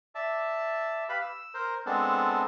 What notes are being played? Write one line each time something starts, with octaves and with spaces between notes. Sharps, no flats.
D5 E5 A5
G4 B4 F5 B5
E6
A#4 C5
G#3 B3 C4 D4 A4